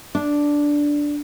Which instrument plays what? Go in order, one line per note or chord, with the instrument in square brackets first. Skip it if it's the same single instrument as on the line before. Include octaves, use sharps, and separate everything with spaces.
[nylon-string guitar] D4